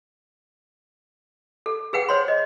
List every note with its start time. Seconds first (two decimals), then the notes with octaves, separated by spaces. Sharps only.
1.66 A4
1.93 G#4 B4 F#5 G5
2.09 C5 C#5 C6
2.28 D#5